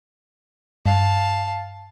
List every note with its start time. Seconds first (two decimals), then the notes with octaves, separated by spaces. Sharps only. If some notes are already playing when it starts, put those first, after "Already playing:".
0.86 G2 F5 A5